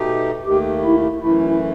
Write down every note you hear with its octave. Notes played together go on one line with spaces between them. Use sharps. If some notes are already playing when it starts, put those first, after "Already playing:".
Already playing: B2 A3 D#4 G4
D#2 D#3 A3 G4
E4
F#2 E3 A3 E4